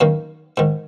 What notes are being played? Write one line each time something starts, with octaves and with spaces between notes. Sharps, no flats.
F#2 D#3 A#3
G#2 D#3